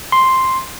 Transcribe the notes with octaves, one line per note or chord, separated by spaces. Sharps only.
C6